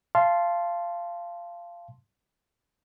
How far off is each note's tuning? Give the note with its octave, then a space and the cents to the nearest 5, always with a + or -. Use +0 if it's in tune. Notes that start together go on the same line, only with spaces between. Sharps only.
F5 -20 A5 -10 C6 +0